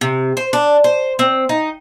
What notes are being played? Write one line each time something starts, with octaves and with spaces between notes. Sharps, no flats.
C3
C5
D4
C5
C4
D#4